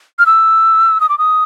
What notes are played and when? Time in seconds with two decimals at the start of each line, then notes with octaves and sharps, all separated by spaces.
0.19 F6
0.26 E6
1.01 D#6
1.09 D6
1.18 D#6